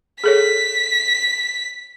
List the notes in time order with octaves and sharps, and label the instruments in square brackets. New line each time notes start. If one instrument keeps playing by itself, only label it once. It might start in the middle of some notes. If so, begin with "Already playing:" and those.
[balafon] G#4 A4 C#5 [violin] B6